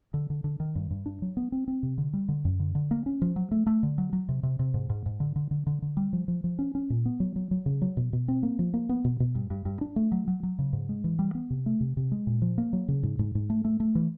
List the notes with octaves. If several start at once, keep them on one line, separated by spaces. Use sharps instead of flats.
D3
D3
D3
D#3
G2
G2
D4
F#3
B3
C4
C4
C3
D3
G3
D3
F#2
D3
D3
A#3
C#4
F3
F#3
A3
A3
D3
F#3
F#3
C3
C3
C3
G#2
G#2
G#2
D3
D3
D3
D3
D3
G3
F3
F3
F3
C#4
C#4
A#2
B3
F#3
F#3
F#3
C#3
F#3
B2
B2
C4
A#3
F3
A#3
B3
B2
B2
G2
G2
G2
D4
A3
F#3
F#3
F#3
C#3
G#2
G#3
E3
G3
B3
C3
A3
C3
C3
G#3
A#2
F3
A#3
F#3
C#3
G#2
G#2
G#2
A3
A3
A3
E3